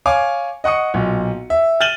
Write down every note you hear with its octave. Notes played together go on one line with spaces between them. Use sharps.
C#5 F5 G#5 D6
D#5 F#5 C#6 D#6 C#7
B1 A#2
E5
F6 A6 D#7 E7 F#7 G7